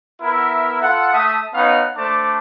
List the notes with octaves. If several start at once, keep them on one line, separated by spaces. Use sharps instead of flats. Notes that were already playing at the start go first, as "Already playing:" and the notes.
B3 E4 A#4 E5
F4 A4 F#5
A3 E5 A5 D#6
B3 C#4 D#4 F5 F#5
A3 D4 C5 A5 D6